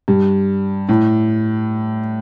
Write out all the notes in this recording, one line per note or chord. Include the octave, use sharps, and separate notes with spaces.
G2
A2